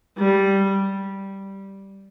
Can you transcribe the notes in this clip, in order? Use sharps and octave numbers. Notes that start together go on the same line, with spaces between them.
G3